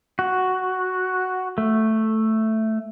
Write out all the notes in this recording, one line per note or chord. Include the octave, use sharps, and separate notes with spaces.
F#4
A3